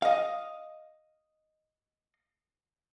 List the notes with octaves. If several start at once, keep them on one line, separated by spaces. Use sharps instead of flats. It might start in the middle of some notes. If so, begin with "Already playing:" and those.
D#5 F5